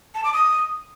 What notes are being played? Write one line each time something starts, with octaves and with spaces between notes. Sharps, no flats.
A5
D6
D#6